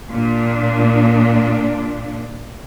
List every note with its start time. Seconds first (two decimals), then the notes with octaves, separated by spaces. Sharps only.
0.11 A#2 D4